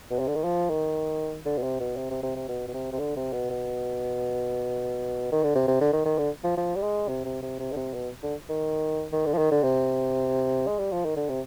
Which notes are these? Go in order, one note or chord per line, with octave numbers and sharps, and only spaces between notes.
B2
C3
D3
D#3
F3
D#3
D3
B2
C3
B2
C3
C3
C3
C3
B2
B2
C3
C3
D3
C3
B2
B2
D#3
D3
C3
C3
D3
D#3
D#3
D3
F3
F3
G3
G#3
C3
C3
C3
C3
D3
C3
B2
D3
D#3
D#3
D3
F3
D#3
D3
C3
G#3
G3
F3
D#3
D3
C3